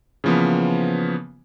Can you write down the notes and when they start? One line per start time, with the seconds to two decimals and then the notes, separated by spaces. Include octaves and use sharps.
0.24 C#3 E3 F3 A#3 B3